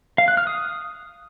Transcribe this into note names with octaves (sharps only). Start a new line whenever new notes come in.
F5
F#6
F6
D#6